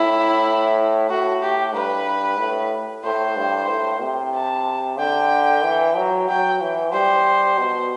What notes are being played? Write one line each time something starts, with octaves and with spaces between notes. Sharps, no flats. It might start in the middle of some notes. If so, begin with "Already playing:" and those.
Already playing: A2 E4
A2 F#4
G4
G2 B4
A2
A2 C5
G2
A2
C3
A5
D3 G5
E3
F#3
F#3 G5
E3
G3 C5
B2